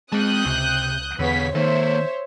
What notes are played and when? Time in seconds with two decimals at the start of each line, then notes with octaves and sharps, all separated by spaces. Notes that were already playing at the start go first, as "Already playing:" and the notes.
0.13 G#3 C4 A5 D#6 F#6 G6
0.46 C#2 C3
1.19 E2 D3 B3 G#4 C#5 B6
1.55 D#3 A#3 A4 C5 C#5 E5